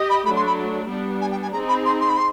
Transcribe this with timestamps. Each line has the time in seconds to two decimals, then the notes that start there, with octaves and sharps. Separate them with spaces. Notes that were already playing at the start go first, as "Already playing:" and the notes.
Already playing: G4 D#5
0.09 B5
0.25 F#3 A3 D4 B5
0.36 C6
0.46 B5
0.88 G3 B3 D4
1.21 G#5
1.31 G5
1.42 G#5
1.52 G#4 A#5
1.55 C4 D#4
1.68 B5
1.85 C6
2.01 C6
2.09 B5
2.17 C6